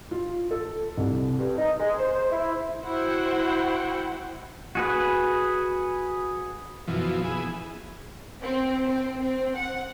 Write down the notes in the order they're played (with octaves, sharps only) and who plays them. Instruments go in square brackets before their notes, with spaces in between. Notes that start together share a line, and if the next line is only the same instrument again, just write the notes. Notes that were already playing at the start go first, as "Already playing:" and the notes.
[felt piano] F4
A4
C2
[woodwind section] G2
D#4
G#3
C5
E4
[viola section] E4 F#4 C5 F#5 G5
[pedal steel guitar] F#4 G#4 B4
[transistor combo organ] F#2 B2 E3 F3
B3 E4 G#4
[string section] C4
C4
C4
F#5